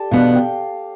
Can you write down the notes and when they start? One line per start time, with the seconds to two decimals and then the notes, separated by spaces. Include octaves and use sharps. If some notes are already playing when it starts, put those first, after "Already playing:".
Already playing: G4 A4 D5 G5 A5
0.11 B2 B3 D4 F5
0.36 G5